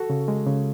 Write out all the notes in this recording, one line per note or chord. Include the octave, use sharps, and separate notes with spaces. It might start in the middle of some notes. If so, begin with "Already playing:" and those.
Already playing: F#4 A4
C#3
G#3
C#3